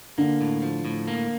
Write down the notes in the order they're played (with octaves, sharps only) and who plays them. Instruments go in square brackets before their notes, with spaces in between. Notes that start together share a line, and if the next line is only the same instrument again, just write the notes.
[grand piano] D3 [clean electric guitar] A#3
[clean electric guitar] A2
F3
A2
A#3